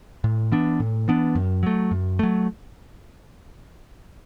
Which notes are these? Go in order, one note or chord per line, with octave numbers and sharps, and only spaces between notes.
A2
E3 B3 D4
A2
E3 B3 D4
F#2
F#3 A3
F#2
F#3 A3